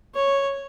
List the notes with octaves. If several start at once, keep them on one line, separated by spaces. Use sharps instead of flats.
C#5